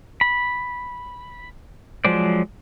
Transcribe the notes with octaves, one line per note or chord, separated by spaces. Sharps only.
B5
F3 F#3 G#3 C5 D5